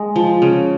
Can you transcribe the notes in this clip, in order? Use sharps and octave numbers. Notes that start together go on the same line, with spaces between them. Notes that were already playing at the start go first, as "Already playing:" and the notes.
Already playing: G#3
F3
C#3